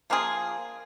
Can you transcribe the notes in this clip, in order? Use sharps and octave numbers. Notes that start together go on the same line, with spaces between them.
F3 A#3 F4 G#4